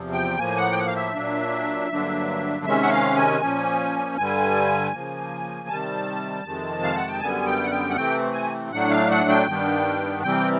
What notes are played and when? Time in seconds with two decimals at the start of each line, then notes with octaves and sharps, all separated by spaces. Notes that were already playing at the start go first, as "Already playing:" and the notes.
Already playing: E2 C3 F3
0.13 G5
0.38 A2 F3 A#3 G#5
0.57 F#5
0.71 G5
0.79 F#5
0.86 F5
0.95 E5
1.14 A#2 F#3 A#3 D4
1.89 G2 D3 F#3 A#3 D4
2.65 C3 D#3 G#3 C#4 E5
2.83 F#5
2.91 F5
3.16 G#5
3.41 A#2 F3 A#3 C#4
4.17 G2 D3 G3 G#5
4.93 C#3 F3 A#3
5.68 C3 D#3 G3 A5
6.45 F2 C3 D#3 G#3
6.83 F5
6.96 F#5
7.08 G5
7.20 F#2 D3 G3 B3 G#5
7.46 G5
7.63 F#5
7.71 G5
7.90 F#5
7.96 C3 E3 A3 C4 G5
8.34 G#5
8.71 A2 F#3 A3 D4 F#5
8.90 F5
9.10 F#5
9.29 G5
9.47 G2 D#3 G3 B3 D4
10.23 C3 E3 G3 C4 G5